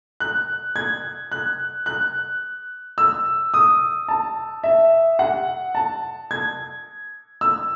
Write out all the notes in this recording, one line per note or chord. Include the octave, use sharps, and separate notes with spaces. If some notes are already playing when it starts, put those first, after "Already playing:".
F#6
G#6
F#6
F#6
E6
D#6
A5
E5
F#5
A5
G#6
E6